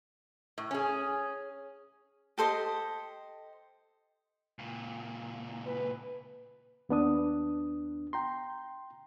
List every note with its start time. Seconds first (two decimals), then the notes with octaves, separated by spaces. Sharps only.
0.58 A2
0.71 C#4 G#4
2.38 G4 A4 C5 D#5
4.59 C#2 A#2
5.66 B4
6.89 D#2 B3 D4 D#6
8.13 G5 A#5 C6